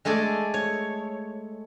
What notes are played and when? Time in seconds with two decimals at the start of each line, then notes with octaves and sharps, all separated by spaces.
0.05 G#3 A3 G#4 A4 D5
0.54 C#5